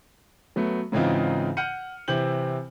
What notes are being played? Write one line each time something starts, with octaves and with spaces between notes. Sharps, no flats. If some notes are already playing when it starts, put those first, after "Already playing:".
F#3 A3 B3
G#2 C#3 E3 C4 D#4 F4
F#5 F6 G6 C#7 D#7
C3 E3 C4 G6 F#7